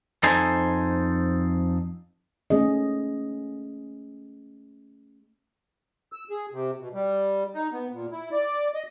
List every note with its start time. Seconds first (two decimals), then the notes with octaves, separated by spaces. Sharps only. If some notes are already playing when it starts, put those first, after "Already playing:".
0.23 F2 D#4 A4 C5 G#5
2.50 A3 C#4 G#4 D#5
6.12 E6
6.30 G#4
6.52 C3
6.79 B2
6.94 G3
7.54 D#4
7.72 B3
7.93 A#2
8.12 E4
8.32 D5
8.74 D#5